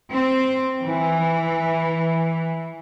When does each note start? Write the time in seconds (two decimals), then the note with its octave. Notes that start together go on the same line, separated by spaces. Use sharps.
0.13 C4
0.83 E3